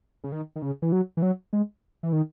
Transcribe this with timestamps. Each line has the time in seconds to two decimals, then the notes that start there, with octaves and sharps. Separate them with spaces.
0.24 C#3
0.32 D#3
0.56 D#3
0.62 C#3
0.82 E3
0.92 F#3
1.17 E3
1.22 F#3
1.53 G#3
2.03 E3
2.13 D#3